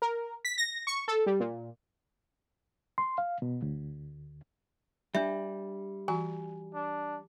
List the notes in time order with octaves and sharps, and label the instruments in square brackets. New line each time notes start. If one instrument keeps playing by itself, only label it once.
[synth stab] A#4
B6
A#6
C#6
A4
G3
A#2
[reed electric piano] C6
F5
B2
D2
[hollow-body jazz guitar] G3 [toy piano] D4 E5
[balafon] E3 F#4 A#5 [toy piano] G#5
[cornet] D4